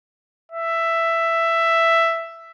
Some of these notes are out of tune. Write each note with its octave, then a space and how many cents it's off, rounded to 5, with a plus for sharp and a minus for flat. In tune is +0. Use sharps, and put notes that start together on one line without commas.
E5 +10